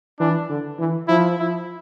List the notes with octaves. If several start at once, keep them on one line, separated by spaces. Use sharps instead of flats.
E3 D4
D3
E3
F3 E4
E4